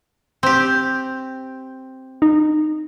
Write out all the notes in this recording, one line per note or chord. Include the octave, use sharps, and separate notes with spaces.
C4 G4
D#4